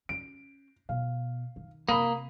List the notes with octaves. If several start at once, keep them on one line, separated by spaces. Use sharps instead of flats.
C#4 D7
B2 F5
D#3
C3 A#3 B5 D#6